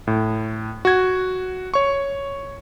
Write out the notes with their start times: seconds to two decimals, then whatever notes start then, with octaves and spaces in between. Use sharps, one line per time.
0.07 A2
0.85 F#4 G#6
1.74 C#5 C#6